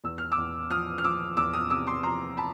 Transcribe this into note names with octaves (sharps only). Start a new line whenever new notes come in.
E2 E6
F6
D6 E6
E2
F3 D#6 F6
F6
F3 D6 E6
E2 D6 E6
D#6 F6
C3 D6 E6
C6 D6
F3 A#5 C6
A5 B5